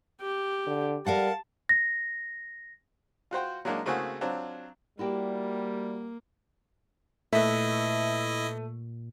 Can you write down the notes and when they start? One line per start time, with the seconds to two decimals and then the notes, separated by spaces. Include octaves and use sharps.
0.21 G4
0.67 D3
1.06 G3 A#4 F5 F#5 A5
1.69 A#6
3.31 F4 F#4 C5 G5
3.65 F#3 G#3 A#3 D4 D#4
3.86 C#3 A3 A#3 C4 F#4 G#4
4.21 F#3 C4 D4 F4
4.99 G3 A#3 E4 F#4 G4
7.33 A#2 A3 E4 B4 D#5 E5